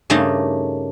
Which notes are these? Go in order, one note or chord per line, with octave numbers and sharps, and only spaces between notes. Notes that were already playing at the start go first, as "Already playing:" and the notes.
G2 C#3 A3 A#3 D#4